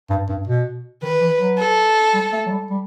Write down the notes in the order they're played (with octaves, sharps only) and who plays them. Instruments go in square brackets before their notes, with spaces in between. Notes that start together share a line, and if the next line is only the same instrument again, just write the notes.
[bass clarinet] G2
G2
B2
[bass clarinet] D#3 [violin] B4
[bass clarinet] E3
F#3
[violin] A4
[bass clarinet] G3
A3
F#3
G3
G3